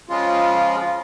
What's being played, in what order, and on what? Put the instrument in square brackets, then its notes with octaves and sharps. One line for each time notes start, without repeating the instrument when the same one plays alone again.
[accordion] C#3 F3 G#3 F4